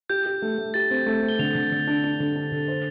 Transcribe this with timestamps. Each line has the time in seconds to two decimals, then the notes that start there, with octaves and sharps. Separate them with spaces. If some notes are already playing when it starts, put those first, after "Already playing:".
0.10 G4 G6
0.26 G4
0.42 A3
0.58 A3
0.74 G4 A6
0.91 C4
1.06 A3
1.22 C4
1.28 G7
1.39 D3 F7
1.55 D3
1.72 D3
1.87 D4
2.04 D4
2.20 D3
2.36 D4
2.52 D3
2.68 C5